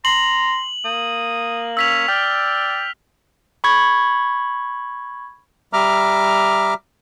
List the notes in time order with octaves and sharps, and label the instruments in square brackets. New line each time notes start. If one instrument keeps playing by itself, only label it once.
[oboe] A#5 [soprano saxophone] C6 [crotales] F#7
[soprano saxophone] A#3 [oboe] D#6
[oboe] C#4 [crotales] E6 B6 F7
[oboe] D5 [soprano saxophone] G5 [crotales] F6
[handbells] B5 C#6 G#6
[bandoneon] G3 E5 A#5 D6 F6